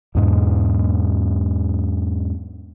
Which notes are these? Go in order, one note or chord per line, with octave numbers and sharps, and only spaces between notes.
E2 G#2 B2